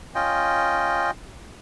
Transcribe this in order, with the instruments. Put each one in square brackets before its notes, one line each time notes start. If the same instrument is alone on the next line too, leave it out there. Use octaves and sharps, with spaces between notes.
[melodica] C#4 F4 D#5 G5